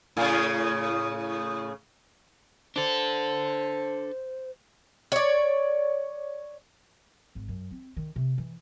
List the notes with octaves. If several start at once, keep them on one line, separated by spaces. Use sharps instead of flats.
A2 C#3
D4 A4 C5
C#5 D5
G#1
F#2
C4
D#3
C3
E3